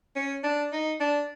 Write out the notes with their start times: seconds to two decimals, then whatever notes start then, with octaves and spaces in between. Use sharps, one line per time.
0.16 C#4
0.44 D4
0.72 D#4
1.00 D4